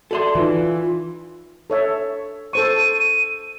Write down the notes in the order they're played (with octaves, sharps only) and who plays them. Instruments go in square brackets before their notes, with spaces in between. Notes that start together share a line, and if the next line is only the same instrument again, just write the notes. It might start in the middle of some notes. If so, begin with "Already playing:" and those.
[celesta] F#4 E5 [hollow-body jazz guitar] A4 D5 C6
[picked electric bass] E3 [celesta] D#4 B4 [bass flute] F4
[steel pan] A4 C#5 E5
[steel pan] A4 C5 C#6 [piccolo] D#7